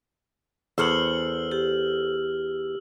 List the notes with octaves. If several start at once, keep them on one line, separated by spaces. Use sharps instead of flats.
E2 A4 C5 F#5 E6 F6 F#7
G4